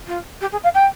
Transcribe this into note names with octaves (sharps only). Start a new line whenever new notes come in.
F4
G4
G#4
F5
G5